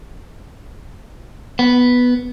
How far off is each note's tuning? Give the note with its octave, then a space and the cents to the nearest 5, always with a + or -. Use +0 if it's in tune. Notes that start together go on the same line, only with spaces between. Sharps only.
B3 +0